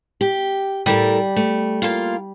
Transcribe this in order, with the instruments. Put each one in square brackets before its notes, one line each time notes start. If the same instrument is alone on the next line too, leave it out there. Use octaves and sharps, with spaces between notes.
[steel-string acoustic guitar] G4
[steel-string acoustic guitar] A2 A4 A#4 [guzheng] G3
[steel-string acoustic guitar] A3
A#3 F4